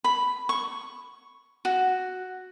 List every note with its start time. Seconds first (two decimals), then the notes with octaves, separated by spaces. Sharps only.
0.04 B5
0.49 C#6
1.65 F#4